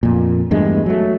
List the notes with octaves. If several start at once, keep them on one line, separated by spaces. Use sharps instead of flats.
F2 A#2
E2 G2 G#3 A3
F#3 A3